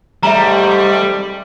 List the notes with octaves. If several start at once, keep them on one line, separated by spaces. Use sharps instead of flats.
G#2 C3 G3 A3 E5 A#5